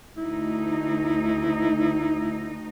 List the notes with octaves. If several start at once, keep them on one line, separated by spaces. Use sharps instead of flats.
D2 D#4 E4